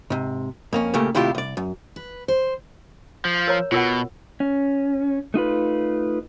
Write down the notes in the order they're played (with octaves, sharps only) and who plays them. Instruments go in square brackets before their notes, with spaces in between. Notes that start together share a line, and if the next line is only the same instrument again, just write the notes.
[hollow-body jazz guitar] G#2 C3
F2 A#3 C#4
A#2 C#3 A3 A#3 G4
D#2 A2 C3 E4 F4 G4
C2 D5
F#2
[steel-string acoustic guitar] B4
C5
[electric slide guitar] F3
[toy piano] A#4 C#5 A#5
[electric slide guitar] B2 [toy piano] F4 A#4 F#5
[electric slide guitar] C#4
A3 D#4 F4 B4